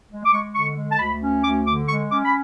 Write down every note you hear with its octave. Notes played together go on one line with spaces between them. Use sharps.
G#3
D6
G#3 C#6
D3 C#6
G#3
A5
D2 B5
C#4
D2 D6
D3 D6
G#3 C#6
C#4 D6
B5